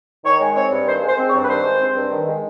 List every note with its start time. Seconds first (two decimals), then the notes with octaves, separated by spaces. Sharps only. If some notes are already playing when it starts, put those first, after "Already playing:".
0.25 D#3 C#5
0.40 G#3
0.56 C4 C#5
0.71 G2
0.87 D#3 C5
1.02 G#3
1.08 C5
1.18 C4
1.28 C#5
1.34 G2
1.43 B4
1.49 D#3 C5
1.64 G#3
1.81 C4
1.96 G2
2.11 D#3
2.27 G#3